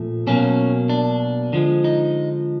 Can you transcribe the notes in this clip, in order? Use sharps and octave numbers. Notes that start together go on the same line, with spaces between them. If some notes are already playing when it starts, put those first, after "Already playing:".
Already playing: A#2 F3 A3
B2 F#3 A#3 C#4
D4
D3 F3 G#3
D#4